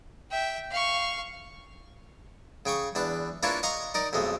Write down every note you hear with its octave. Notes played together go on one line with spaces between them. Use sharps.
E5 G5
F5 C#6
C#3 G5 C#6 D#6
E2 D4 B4
A#3 D4 E4 F4 B4 C#5
D#5 F5 A#5 C6 C#6 D#6
D#4 A#4 D5
B1 F2 G#3 A3